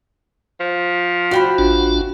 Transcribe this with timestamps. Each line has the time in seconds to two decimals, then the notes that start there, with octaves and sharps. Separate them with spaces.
0.60 F3
1.31 F#4 D5 G5 B5
1.58 A1 D4 F4